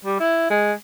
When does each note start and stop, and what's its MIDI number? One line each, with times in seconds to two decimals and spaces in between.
0.05 0.19 55
0.20 0.48 64
0.50 0.73 56